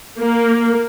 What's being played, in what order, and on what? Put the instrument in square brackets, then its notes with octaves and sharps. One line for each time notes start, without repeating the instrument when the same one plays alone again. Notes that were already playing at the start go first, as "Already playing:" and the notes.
[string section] A#3